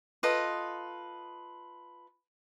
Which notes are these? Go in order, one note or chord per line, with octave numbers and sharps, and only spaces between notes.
F4 A4 B4 D#5